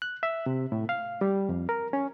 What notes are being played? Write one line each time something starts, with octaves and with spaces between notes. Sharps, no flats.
F#6
E5
C3
A2
F5
G3
F2
A#4
C#4